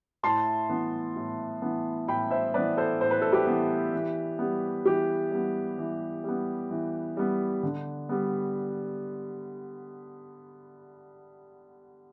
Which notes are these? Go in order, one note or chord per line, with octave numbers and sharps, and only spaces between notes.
A2 A5 C6
E3 B3
A2
E3 B3
A2 G5 B5
C5 E5
E3 B3 B4 D5
A4 C5
A2 C5
B4
A4
G4 B4
E3 B3
E3
G3 B3
E3 G4
G3 B3
E3
G3 B3
E3
G3 B3
D3
G3 B3